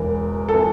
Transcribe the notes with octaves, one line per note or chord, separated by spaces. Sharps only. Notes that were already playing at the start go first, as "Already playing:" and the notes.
Already playing: E1 E2 E3 A#4
E3 A4